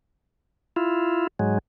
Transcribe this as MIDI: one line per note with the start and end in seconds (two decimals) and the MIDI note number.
0.76 1.27 64
0.76 1.27 65
1.39 1.58 44
1.39 1.58 54
1.39 1.58 56